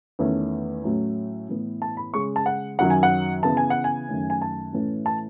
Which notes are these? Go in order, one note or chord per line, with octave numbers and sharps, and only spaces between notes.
E2 D#3 A3 C#4
A2 F#3 A3 C#4
A2 E3 B3
A5
B5
C#3 G#3 C#4 C#6
A5
F#5
F#2 D#3 F#3 C#4 F#5
G#5
F#5
C#3 E3 B3 A5
G#5
F#5
G#5
F#2 D#3 A3 C#4
G#5
A5
A2 E3 A3 C#4
A5